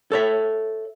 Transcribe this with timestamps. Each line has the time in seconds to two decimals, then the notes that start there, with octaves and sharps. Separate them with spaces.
0.12 A4 C#5 E5